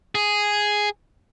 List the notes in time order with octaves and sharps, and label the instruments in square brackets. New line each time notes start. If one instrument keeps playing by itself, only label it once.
[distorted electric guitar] G#4